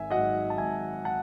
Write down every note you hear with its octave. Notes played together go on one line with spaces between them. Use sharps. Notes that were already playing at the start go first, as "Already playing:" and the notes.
Already playing: G#1 E5 G#5
G#2 F#3 D#5 F#5
A5
G#1 E5 G#5
F#5 A5